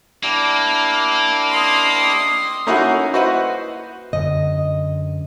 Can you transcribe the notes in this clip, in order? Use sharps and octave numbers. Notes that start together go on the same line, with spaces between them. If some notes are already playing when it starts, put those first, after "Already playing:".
A#3 D4 E4 G4
D#5 C6
A#3 C#4 D#4 E4 F#4 F#5
E4 F#4 B4 C5 D#5 F#5
F#2 D3 D#5